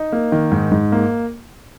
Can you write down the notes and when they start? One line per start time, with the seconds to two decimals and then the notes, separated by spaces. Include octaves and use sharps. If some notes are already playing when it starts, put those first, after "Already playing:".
Already playing: D#4
0.12 A#3
0.32 D#3
0.51 G#2
0.72 G#2
0.92 A#3